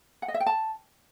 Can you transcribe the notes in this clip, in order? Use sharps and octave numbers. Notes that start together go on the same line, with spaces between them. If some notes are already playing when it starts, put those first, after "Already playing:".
F#5
D#5
E5
G5
A5